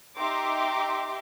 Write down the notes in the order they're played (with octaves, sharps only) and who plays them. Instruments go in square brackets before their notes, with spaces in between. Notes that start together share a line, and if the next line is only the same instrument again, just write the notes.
[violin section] D#4 G4 E5 A#5 C6 D6